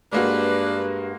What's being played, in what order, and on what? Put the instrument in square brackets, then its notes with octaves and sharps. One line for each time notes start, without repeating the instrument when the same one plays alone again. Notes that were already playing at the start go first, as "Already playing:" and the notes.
[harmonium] G2 [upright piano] G#3 A#3 F#4 [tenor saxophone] D4 [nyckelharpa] B4